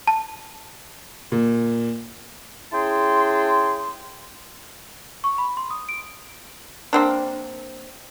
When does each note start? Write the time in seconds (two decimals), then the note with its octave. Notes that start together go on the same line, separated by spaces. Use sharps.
0.07 A5
1.32 A#2
2.72 C#4 E4 G#4 G5 A5 C6
5.24 C#6
5.38 B5
5.57 C6
5.71 D#6
5.89 D7
6.93 A#3 C4 D4